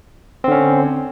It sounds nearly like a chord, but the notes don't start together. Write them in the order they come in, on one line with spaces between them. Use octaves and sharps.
C4 D3 C#4